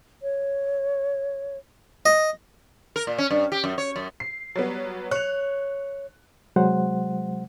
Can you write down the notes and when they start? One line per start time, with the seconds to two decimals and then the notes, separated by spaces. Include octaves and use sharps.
0.23 C#5
2.06 D#5
2.96 A#4
3.07 A#2
3.18 C#4
3.31 G2
3.52 G4
3.64 F#2
3.78 C#5
3.96 F#2
4.20 C7
4.56 F#3 G3 B3
5.11 C#5 F#6 F7
6.56 C3 F#3 G#3 C5 F#5